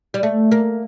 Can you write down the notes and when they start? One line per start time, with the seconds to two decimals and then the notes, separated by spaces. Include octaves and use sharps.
0.14 G3
0.23 A3
0.52 A#3